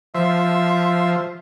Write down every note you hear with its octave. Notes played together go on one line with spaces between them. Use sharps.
F3 C5 E5